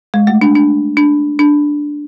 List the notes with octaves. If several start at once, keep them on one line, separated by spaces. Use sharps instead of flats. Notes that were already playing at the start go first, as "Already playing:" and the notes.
G#3
A3
D4
D4
D4
D4